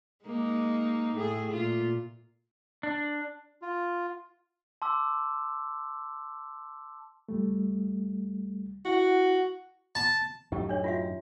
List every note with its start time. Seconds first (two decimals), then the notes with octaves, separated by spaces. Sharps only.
0.25 G#3 A#3 D#4
1.15 A2 A3 G#4
1.52 A#2 F4
2.83 D4
3.62 F4
4.82 A5 C6 D6 E6
7.29 C#2 G3 A3
8.85 E4 F#4 F#5
9.95 A5
10.52 F#2 A2 D#3 G4
10.69 D4 C#5
10.84 F4 F#4 E5